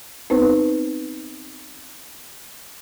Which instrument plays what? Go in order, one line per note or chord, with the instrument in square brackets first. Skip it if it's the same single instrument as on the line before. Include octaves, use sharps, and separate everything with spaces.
[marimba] B3 C4 D#4 B4 C5